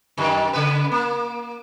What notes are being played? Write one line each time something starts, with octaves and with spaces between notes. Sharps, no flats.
F#2 D#3
C#3 B4
A#3